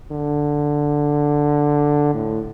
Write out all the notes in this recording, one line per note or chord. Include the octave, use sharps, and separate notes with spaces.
D3
A2